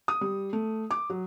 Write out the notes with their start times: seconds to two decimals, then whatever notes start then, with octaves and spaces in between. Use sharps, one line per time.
0.08 D#6
0.21 G3
0.53 A3
0.91 D6
1.10 F#3